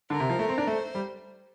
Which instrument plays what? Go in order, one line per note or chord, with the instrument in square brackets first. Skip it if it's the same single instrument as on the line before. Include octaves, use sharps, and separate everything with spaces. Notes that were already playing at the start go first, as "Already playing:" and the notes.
[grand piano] D3 [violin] A#4
[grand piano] C3
F3
A3
C4
D4
[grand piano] A3 [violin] C5
[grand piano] G3